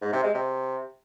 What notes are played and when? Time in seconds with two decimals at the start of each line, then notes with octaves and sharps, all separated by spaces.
0.02 G#2
0.13 C3
0.23 G#3
0.34 C3